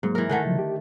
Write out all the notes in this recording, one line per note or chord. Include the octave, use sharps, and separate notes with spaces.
G#2 F#3 G#3 A#3
E3 A#4
D3 D#3 A3 F#5 G#5
C#3 F3 F#3
G4